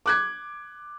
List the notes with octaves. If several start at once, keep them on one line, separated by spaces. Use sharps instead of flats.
D6 F#6 G#6